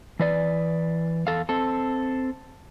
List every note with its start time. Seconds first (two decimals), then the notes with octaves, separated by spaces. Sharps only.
0.19 E3 B4 D5
1.27 E2 A4 F5
1.49 C4 A4